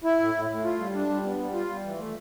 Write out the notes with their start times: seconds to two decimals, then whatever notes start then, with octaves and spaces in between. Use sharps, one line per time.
0.04 E4
0.20 A2
0.35 A2
0.50 A2
0.64 F4
0.79 G3
0.94 D4
1.09 G3
1.24 B3
1.39 G3
1.54 F4
1.69 G3
1.85 E3
1.99 A3